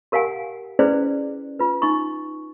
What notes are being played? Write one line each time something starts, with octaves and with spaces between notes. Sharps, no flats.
G4 A#4 F5 F#5 G#5
C#4 E4 G#4 B4 C5 D5
F4 B4
D#4 C#6